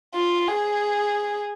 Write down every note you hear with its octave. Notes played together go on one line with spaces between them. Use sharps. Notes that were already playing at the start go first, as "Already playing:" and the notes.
F4
G#4